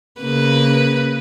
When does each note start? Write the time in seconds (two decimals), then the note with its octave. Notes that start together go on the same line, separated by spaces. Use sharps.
0.21 C#3 A#3 B4